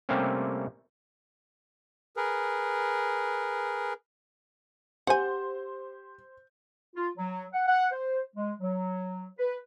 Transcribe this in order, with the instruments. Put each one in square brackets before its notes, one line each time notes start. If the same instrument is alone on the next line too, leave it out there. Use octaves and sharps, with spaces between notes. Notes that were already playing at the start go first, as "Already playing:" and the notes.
[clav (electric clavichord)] C3 G3 A3 A#3 C4 C#4
[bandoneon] G#4 A#4 B4
[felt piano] G4 G6 [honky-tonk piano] C5 [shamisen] F#5 G#5
[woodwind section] F4
F#3
F#5
F#5
C5
G#3
F#3
B4